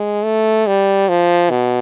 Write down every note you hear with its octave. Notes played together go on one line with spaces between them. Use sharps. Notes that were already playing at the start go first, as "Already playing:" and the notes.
Already playing: G#3
A3
G3
F3
B2